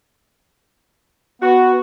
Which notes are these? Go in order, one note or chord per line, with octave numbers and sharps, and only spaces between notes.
B3 F#4